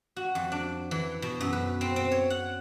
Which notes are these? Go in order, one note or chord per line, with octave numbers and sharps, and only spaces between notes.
F#4
F2
D4
E3
B2
F#2
B4
C4
C4
C#5
F#5